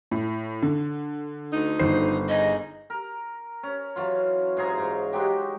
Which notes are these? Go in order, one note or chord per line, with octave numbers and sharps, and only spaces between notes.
A2
D3
D2 D#4
G1 D#3 C5 C7
D#4 G#4 D#5
A#4
C#4
E3 F#3 F4
G#2 G#4 A#5 C#6
G#2
G#3 D#4 F#4 G4